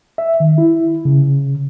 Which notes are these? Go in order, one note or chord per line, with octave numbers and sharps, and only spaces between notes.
E5
D#3
E4
C#3